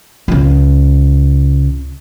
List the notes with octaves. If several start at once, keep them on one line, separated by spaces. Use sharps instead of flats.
C#2 C#3